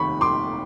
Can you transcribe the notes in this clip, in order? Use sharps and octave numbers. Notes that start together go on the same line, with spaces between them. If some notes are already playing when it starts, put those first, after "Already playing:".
Already playing: F1 D#2 D#3 B5 C#6
C6 D6